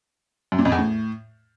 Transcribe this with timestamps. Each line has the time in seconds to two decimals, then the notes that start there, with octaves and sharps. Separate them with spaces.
0.52 F#2
0.59 A#2
0.65 F2
0.72 E2
0.78 A2